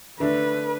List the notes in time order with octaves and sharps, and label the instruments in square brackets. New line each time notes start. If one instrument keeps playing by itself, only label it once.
[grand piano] D3 A3 D4 [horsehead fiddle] B4